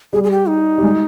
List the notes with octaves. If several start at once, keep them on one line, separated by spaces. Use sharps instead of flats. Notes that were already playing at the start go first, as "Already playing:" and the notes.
G3 G#4
G#4
G4
D#4
G3
G#3